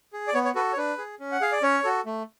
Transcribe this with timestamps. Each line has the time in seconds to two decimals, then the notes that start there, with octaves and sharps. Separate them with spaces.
0.13 G#4
0.27 D5
0.34 B3 C#5
0.45 C#5
0.55 F#4 A4 B4
0.73 C#5
0.77 D4 B4
0.98 G#4
1.20 C#4
1.32 F#5
1.41 G#4 F5
1.52 D5
1.63 C#4 C#5
1.84 F#4 A4
2.06 A3